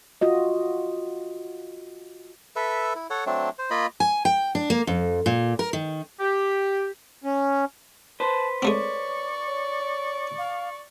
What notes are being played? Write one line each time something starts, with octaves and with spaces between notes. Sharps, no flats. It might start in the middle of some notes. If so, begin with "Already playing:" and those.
F4 F#4 D#5
A4 B4 E5
E4
A4 C#5 F#5
F#3 A3 C4 D4
C5
A#3 F4 D#5 B5
G#5
G5
D4
A#3
F2
A#2
A#4
D#3
G4
C#4
B4 C5 A5
G#3 A3 C4 C#5 D5 C#6
C#5
F5